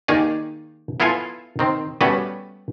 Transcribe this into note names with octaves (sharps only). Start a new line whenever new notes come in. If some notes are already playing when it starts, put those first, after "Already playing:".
D#3 A#3 D#4 G4 G#4 D5
B3 E4 F4 A4 F5 G#5
D#3 C4
G3 A3 B3 C#4 F#4 B4